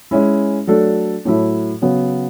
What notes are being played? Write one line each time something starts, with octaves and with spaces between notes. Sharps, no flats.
G#3 C#4 E4
F#3 A3 D4 A4
A2 F#3 A3 E4
C#3 F#3 B3